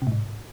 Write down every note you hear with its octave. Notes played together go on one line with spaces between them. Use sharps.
C3
A2
G#2